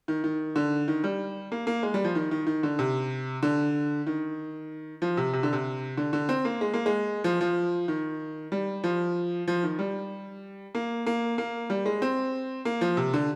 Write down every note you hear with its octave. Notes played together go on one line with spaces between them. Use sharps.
D#3
D#3
D3
D#3
G3
A#3
A#3
G#3
G3
F3
D#3
D#3
D#3
D3
C3
D3
D#3
F3
C3
C3
D3
C3
D3
D3
C4
A#3
G#3
A#3
G#3
F3
F3
D#3
G3
F3
F3
D#3
G3
A#3
A#3
A#3
G3
G#3
C4
A#3
F3
C3
D3